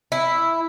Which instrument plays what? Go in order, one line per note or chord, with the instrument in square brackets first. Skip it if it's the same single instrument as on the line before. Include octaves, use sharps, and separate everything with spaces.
[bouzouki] E4